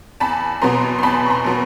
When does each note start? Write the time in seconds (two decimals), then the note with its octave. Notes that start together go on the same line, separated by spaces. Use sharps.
0.20 E2 A5 B5
0.62 B2 F#3 B3 A#5 C6
0.99 C6
1.03 E2 A5 B5
1.26 C#6
1.30 A#5 C6
1.44 B2 F#3 B3